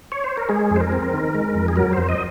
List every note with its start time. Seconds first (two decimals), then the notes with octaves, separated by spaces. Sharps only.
0.12 C#5
0.24 C5
0.37 A#4
0.49 G#3 G#4
0.71 F2
0.76 C5
0.81 A#4
0.92 C4
1.13 D#3
1.34 G#3
1.55 F2
1.68 G#4
1.76 F#3 A#4
1.93 F2 C5
2.09 D#5